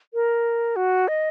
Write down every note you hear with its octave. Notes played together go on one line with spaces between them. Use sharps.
A#4
F#4
D#5